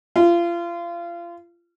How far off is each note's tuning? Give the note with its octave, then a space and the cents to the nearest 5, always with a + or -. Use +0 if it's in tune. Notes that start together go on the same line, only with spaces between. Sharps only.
F4 -30